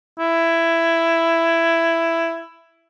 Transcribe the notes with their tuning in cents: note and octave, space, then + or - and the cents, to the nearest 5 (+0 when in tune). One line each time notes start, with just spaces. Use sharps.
E4 +10